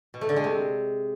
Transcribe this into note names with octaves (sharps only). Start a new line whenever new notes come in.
B2
A3
D3
G#3
C3